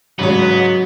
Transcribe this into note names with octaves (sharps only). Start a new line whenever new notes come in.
G#2 C#3 F#3 B3 C#5